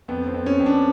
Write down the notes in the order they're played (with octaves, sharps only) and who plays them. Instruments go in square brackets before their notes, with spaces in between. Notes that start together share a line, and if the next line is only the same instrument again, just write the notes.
[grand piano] F2 B3
C4
F2
C#4
F2
D4